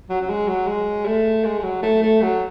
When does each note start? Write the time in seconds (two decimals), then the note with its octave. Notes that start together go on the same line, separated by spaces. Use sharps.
0.10 F#3
0.21 F#3
0.29 G#3
0.48 F#3
0.67 G#3
1.06 A3
1.45 G#3
1.59 G#3
1.64 F#3
1.83 A3
2.02 A3
2.22 F#3